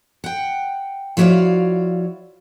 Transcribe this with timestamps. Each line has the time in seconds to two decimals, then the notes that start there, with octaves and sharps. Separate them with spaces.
0.24 F#5 G5
1.17 F3 E4 F#4 C#5 D5 F5